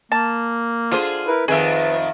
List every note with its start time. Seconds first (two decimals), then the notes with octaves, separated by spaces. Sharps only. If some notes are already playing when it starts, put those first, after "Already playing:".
0.12 A#3 A5
0.92 D3 F4 G#4 C5
1.27 E4 A#4 B4
1.48 F2 D#3 G#4 B4 E5